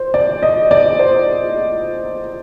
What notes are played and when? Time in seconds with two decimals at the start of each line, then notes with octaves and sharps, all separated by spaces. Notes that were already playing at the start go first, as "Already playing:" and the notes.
Already playing: C5
0.14 D5
0.43 D#5
0.71 D5
0.99 C5